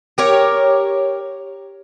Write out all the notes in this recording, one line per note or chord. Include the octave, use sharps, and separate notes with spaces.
G4 A#4 C#5